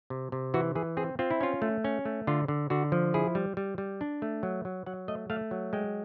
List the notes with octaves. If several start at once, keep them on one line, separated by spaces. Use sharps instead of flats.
C3
C3
E3 F#4
E3 G#4
C4 G#4
C4 F4
E4
C#4 F4
A3
C#4
A3
D3 F4
D3
D3 F#4
F3
E4 G#4
G3
G3
G3
D4
A3
F#3
F#3
F#3 F#5
A3 D#5
A3 F5
F#3
G#3 G5